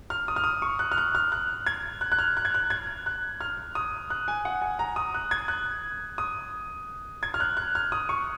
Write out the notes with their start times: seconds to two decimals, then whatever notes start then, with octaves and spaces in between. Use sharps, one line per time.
0.10 F6
0.28 D#6
0.36 F6
0.44 D#6
0.62 C#6
0.79 F#6
0.92 F6
0.98 F#6
1.15 F6
1.32 F#6
1.66 G#6
2.01 F#6
2.12 F#6
2.19 F6
2.37 F#6
2.45 G#6
2.54 F#6
2.70 G#6
3.06 F#6
3.41 F6
3.75 D#6
4.10 F#6
4.28 G#5
4.45 F#5
4.61 G#5
4.79 A#5
4.96 D#6
5.14 F#6
5.31 G#6
5.48 F#6
6.18 D#6
7.23 G#6
7.34 F6
7.40 F#6
7.57 F#6
7.75 F6
7.92 D#6
8.09 C#6